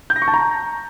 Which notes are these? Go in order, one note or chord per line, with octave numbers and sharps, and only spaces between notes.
G6
A#6
C#6
A5
A#5